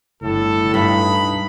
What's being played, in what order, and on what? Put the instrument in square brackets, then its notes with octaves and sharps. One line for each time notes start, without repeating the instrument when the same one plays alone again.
[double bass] G1 [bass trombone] A2 [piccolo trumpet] A4
[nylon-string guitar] G2 [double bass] D#4 [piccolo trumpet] B5